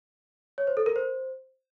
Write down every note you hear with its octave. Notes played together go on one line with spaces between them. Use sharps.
C#5
C5
A4
A#4
C5